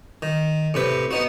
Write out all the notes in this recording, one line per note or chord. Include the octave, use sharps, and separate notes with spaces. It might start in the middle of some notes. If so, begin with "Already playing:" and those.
D#3
A2 C3 B4
B3 D#4 F#4